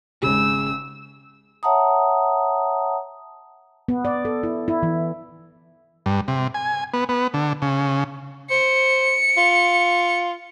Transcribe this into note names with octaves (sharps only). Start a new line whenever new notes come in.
G#1 C#3 E6
C#5 E5 F#5 A5 A#5 D#6
B3
D5
A4
E4
E4
E3
G2
C3
G#5
B3
B3
D3
C#3
C5 C#7
F4